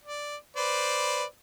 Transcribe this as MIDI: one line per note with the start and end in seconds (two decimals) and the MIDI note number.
0.04 0.36 74
0.56 1.24 71
0.56 1.24 72
0.56 1.24 74